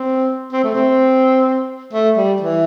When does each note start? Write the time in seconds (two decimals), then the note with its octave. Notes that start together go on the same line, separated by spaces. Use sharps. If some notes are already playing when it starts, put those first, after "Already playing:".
Already playing: C4
0.53 C4
0.64 A3
0.75 C4
1.93 A3
2.17 G3
2.41 E3